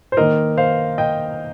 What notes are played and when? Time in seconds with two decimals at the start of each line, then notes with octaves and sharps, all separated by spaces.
0.12 C5
0.17 D#3 A#3 D#4 A#4 D#5
0.57 C5 F5
0.98 D#5 G5